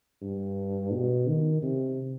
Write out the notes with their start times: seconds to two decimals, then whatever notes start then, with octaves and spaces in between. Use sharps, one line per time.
0.22 G2
0.92 B2
1.27 D#3
1.62 C3